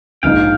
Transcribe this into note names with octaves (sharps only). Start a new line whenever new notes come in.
A#1 G#2 F3 A#3 D#4 F5 G5